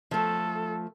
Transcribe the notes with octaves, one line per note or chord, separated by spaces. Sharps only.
F3 A3 A4